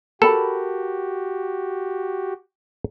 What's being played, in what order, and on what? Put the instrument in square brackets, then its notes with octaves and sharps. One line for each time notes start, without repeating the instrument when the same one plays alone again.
[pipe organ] F#4 G4 [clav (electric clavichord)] A4 [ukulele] A#4 A5 B5